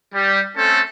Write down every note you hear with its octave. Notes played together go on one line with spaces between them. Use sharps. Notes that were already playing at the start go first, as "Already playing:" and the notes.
G3
A3 C4 C#4 A4